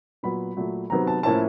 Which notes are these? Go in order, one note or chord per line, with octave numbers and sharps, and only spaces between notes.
A#2 F#3 B3 B5
A#2 F#3 A3
C3 D#3 F#3 B3 A#5
A5
A2 F3 A#3 C#4 E4 A5